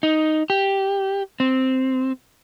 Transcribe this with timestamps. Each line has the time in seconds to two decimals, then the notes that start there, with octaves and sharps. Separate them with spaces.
0.03 D#4
0.50 G4
1.40 C4